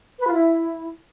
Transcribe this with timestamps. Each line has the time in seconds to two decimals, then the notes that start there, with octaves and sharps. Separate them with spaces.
0.19 B4
0.26 F4
0.34 E4